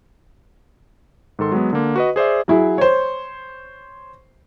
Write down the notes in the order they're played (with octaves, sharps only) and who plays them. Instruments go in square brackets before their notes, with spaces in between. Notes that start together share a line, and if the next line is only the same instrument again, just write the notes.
[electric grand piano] G#2 D#3 A4 C6
F#3 G#3 B3
D3 A#3
F#4 B4 D#5
G#4 C5 D5 E5
[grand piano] F#3 E4 G#4
C5 C#5